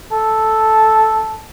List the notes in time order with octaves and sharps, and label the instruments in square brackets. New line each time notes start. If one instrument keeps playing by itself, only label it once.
[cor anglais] A4